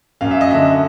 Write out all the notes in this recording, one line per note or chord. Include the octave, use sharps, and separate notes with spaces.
F#2 F5
E5
D#5
D3 E5